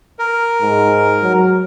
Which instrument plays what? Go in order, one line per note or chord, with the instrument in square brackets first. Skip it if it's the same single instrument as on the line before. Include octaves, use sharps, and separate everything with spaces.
[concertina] A#4
[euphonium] G#2
F#3